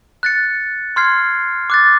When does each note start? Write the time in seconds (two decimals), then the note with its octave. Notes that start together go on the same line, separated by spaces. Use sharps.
0.23 F#6 A6 C#7
0.96 C6 F6 G#6 C7
1.70 D6 F#6 A6